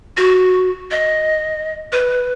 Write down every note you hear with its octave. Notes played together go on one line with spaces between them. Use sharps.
F#4
D#5
B4